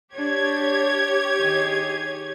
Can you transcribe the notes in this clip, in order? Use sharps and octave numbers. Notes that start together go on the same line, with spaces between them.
D4 G4 C#5 G#6
D#3 G#4